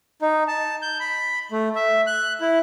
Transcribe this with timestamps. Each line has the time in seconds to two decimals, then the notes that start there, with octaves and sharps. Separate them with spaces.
0.22 D#4
0.48 A5
0.82 G6
1.00 B5
1.52 A3
1.75 E5
2.07 F#6
2.41 E4